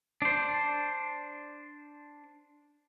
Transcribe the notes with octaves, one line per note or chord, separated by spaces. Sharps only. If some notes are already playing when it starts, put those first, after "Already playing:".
D4 C5